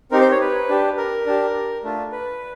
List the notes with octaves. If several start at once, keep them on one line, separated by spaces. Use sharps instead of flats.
C4 D#4 G4 A#4
C5
C#5
B4
D4 G4
A#4
D4 G4
A3 D4 F4
B4